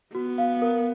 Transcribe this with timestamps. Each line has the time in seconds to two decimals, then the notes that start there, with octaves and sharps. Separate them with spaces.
0.15 B3 F#4
0.38 F5
0.62 A#4